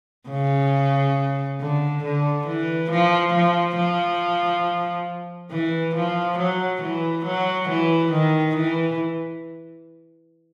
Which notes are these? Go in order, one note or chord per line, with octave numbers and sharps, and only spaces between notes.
C#3
D3
D3
E3
F3
F3
F3
E3
F3
F#3
E3
F#3
E3
D#3
E3